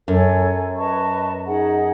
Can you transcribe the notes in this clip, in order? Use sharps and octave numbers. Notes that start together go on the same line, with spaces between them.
F#2 A4 C#5 G#5
B4 D#5 A5 C#6
D#4 G#4 D#5 F#5